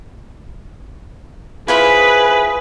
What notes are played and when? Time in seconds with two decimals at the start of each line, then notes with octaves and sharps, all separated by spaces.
1.68 E4 F4 G#4 B4 C5